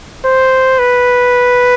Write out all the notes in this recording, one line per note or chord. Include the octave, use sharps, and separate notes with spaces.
C5
B4